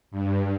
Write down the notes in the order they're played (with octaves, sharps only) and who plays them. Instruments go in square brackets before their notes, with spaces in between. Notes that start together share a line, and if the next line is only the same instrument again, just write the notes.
[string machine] G2